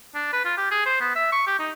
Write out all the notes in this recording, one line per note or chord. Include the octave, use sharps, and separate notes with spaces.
D4
B4
F4
G4
G#4
C5
B3
E5
C#6
G4
D#4